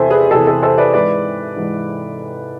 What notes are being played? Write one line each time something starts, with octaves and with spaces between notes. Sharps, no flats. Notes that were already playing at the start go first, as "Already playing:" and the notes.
Already playing: E2 C3 E3 A4 C5 E5 G#5
G#4 B4
E2 C3 E3 A4
A4
A4 C5
B4 D5
G#2 E3 B4 D5
G#2 E3